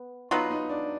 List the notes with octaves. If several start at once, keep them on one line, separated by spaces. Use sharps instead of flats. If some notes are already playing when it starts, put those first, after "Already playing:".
Already playing: B3
F#3 B3 D#4 F4 B4
D#4
D4